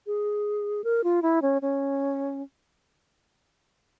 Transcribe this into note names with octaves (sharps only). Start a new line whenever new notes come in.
G#4
A#4
F4
E4
C#4
C#4